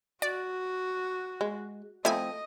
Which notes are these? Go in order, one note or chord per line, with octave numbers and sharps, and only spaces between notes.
F#4 D5
G#3
F3 A3 C4 E4 D#5 G#5